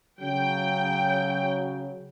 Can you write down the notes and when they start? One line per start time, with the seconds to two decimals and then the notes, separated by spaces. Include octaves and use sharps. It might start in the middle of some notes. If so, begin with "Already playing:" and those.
0.21 C#3 F#3 G5